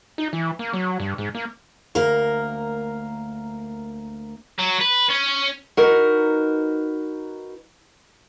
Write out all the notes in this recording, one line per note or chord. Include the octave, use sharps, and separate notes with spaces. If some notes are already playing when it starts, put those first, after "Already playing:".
D#4
E3
A#3
F#3
G2
G#2
A#3
D2 A#3 A#4
F#3
B4
C#4
D#4 F#4 A#4 B4